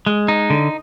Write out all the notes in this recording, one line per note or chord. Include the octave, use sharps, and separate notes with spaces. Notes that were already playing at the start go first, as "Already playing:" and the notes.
G#3
D#4
D3